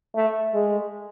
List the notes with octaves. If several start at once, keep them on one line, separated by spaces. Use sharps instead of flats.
A3
G#3